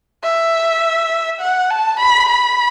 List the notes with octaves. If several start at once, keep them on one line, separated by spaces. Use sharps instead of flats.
E5
F#5
A5
B5
B5